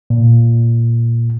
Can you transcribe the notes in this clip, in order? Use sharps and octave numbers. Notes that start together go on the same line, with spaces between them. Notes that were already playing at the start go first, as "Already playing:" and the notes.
A#2